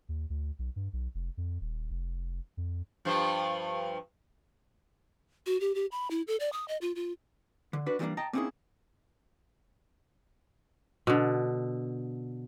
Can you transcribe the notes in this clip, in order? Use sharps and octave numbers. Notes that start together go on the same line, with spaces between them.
D#2
D2
B1
G2
B1
F1
F2
D#1
F1
F2
G2 F3 C5
F#4
G4
G4
B5
E4
A4
D5
D#6
D#5
F4
F4
D3
D4 F#4 B4
E3 F3 G3 A3 A#3 D4
D#5 G5 A5 A#5
A#3 C4 C#4 D#4 E4 G#4
B2 D3